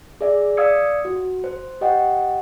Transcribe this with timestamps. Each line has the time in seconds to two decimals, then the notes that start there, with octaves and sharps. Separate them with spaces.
0.21 G#4 D5 E5
0.57 D5 F5 D#6 E6 G#6 C#7
1.05 F#4
1.44 C5
1.81 G4 D#5 F#5 G5